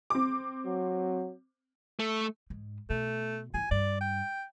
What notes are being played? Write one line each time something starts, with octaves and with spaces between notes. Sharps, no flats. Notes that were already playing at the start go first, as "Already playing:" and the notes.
C4 D6
F#3
A3
G#2
B2 A3
E4 F4 G#5
G2 D5
G5